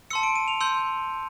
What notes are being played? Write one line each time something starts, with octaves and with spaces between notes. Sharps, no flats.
A5 C6 E6 C#7
D7
D#7
F7
C6 E6 G6